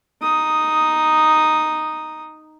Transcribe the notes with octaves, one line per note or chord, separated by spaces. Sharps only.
D#4 D#6